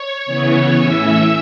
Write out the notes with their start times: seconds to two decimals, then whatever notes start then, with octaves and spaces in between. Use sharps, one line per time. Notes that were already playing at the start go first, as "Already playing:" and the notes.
Already playing: C#5
0.26 C#3 E3 B3
0.77 A2 E3 C#4 E5 E6